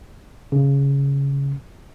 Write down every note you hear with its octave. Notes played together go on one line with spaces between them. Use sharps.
C#3